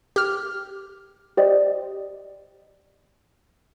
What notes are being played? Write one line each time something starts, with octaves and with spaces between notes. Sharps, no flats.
G4 F6
G4 C5 D5 D#5 G5